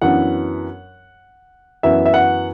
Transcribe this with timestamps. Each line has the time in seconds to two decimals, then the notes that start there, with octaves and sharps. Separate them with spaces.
0.02 F#2 E3 B3 D4 F#5
1.83 F#2 E3 B3 E5
2.06 E5
2.14 F#5